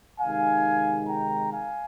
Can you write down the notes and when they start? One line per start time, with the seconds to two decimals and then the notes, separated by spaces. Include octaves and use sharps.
0.21 C3 D#3 G#3 D#4 F5 G#5
1.09 G5 A#5
1.52 F5 G#5